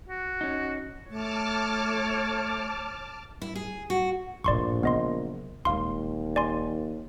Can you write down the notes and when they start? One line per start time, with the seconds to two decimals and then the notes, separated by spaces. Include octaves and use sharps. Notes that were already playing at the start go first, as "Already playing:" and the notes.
0.09 F#4
0.41 C#4 D#4
1.10 A3 C#5 A5 D6 F6
3.42 E4
3.55 G#4
3.90 F#4
4.44 A#1 F#2 A2 D5 C6 C#6
4.83 C#3 F#3 B3 D#5 C6
5.65 D#1 D#2 G#3 F5 C6
6.36 D5 G#5 C6